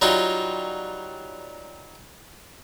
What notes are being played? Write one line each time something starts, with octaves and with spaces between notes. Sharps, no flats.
F#3 G3 D#4 F4 F#4